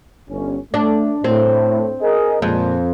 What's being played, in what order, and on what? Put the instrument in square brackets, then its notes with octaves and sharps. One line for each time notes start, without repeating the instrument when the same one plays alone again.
[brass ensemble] G1 C#4
[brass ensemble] A3 [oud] D4
[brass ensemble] A2 [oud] C4
[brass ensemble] G#4 A#4 D#5
[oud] F2 [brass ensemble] A#2 G#3